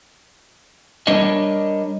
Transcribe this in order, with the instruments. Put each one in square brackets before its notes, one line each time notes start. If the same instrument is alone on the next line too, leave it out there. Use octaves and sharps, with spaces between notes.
[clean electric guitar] G3 D4 A#4 C#5 D#5